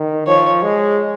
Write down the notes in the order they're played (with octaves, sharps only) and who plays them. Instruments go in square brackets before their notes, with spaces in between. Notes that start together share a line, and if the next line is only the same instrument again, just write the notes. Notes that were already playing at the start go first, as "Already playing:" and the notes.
Already playing: [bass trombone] D#3
[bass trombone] F3 [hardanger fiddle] C#5
[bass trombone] G#3